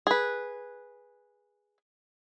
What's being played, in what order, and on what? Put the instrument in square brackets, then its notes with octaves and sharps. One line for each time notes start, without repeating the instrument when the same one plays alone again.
[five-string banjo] G#4 B4